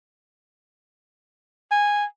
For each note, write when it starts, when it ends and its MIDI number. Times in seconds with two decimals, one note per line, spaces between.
1.72 2.05 80